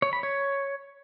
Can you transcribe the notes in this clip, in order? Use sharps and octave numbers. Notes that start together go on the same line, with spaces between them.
C#5
B5
C#5